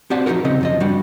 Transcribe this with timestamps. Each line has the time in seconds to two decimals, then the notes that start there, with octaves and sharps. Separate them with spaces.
0.10 C4 F#4 G4 D5 F#5 A5
0.26 F3 D#4 F4 F#4 A#4
0.44 C2 C#3 C4 C#4 D#5
0.61 F#2 F3 D#5
0.80 G3 D4 F#4